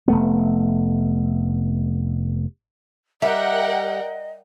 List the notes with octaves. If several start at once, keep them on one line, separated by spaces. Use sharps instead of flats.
F1 A3 B3
G3 A#4 D#5 E5 F#5 G5